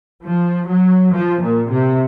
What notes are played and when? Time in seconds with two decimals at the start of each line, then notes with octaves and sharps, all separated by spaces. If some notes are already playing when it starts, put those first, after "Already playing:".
0.23 F3
0.68 F#3
1.12 F3
1.41 A#2
1.70 C3